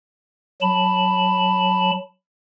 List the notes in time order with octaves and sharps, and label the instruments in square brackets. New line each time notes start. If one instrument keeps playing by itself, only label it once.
[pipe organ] F#3 A5 B5